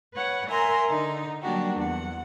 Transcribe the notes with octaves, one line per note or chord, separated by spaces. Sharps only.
B4 C#5 F#5
A#4 E5 G#5 A#5 C6
D3 D#4
F#3 G3 A#3 D4 F#4 G4
E2 F#5